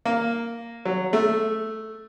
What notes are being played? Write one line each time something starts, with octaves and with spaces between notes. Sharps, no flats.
A#3
F#3
A3